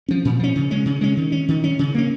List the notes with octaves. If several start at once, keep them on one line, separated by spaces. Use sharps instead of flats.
F3 C#4
A#2
F3 C#4
C#3
G#3 C#4
C#3
G#3 C#4
D#3
C#4
D#3
C#4
C#3
A#3 C#4